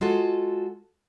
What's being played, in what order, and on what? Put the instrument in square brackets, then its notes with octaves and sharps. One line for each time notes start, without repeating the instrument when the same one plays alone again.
[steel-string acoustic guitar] G#3 F4 F#4 A4